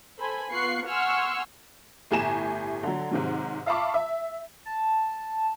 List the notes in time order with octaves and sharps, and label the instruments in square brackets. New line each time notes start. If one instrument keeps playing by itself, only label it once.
[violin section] A4 C5 G#5 B5
B3 F4 C#6 F#6 C7
F#5 G#5 C6 C#6 E6 F6
[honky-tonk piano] G1 A2 G4 G#5 A#5 E7
D3 F#3
G#2 C3 D#3 F#3
E5 F5 A5 B5 C#6 D6
E5
[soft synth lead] A5